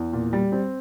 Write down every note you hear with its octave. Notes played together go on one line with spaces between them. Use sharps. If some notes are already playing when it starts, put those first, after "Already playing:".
Already playing: E2
A#2
G3
C4